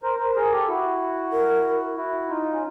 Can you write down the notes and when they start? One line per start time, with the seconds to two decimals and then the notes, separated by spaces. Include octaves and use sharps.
0.03 A#4 C5
0.19 A#4 C5
0.35 G#4 A#4
0.52 G4 A4
0.68 E4 F#4
1.32 A#4
1.97 E4 F#4
2.29 D#4 F4
2.53 C#4